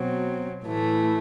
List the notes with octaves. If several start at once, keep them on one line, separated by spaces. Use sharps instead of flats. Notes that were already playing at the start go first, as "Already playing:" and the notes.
Already playing: B2 F#3 C4
A2 E3 A3 E4